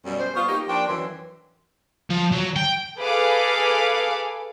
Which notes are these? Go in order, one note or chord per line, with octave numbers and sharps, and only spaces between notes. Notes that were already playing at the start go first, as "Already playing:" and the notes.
F#2 B2 G3
C5
B3 F4 C#6
A#3 D#4 G4
F3 A#3 D4 G5
F#2 E3 C6
F3
F#3
G5
G#4 A4 B4 F5 D6